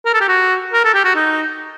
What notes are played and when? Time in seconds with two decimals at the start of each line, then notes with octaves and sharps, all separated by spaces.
0.05 A#4
0.13 A4
0.21 G4
0.28 F#4
0.73 A#4
0.84 A4
0.94 G4
1.05 F#4
1.15 D#4